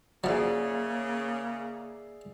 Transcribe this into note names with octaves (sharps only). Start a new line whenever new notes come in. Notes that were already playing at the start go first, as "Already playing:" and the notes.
C#3 F3 F#3 A#3 G#4 D5 E5